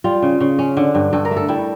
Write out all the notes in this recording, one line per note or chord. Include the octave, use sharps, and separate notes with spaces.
G3 F4
C#3
C#3
C#4
D3
G2
G2 A4
A#4
A3
A4
G3 E4